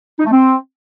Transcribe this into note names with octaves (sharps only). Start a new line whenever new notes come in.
D#4
A3
C4